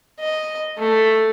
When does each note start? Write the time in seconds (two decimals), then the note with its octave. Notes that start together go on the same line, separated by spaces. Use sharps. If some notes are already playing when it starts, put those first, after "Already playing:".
0.20 D#5
0.78 A3